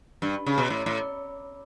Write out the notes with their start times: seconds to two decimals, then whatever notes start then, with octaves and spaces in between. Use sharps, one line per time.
0.22 G2
0.46 C#3
0.58 B2
0.70 A2
0.86 A2